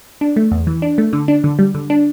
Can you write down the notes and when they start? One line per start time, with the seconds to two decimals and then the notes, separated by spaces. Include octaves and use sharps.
0.21 D4
0.36 A3
0.51 E2
0.67 E3
0.82 D4
0.98 A3
1.13 D3
1.28 D4
1.44 D3
1.59 G3
1.74 D3
1.90 D4